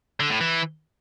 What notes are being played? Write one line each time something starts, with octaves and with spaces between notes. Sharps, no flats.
D3
A2
E3